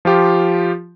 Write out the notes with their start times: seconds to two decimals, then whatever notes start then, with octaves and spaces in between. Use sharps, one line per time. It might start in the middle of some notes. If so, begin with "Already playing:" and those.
0.05 F3 F4 G4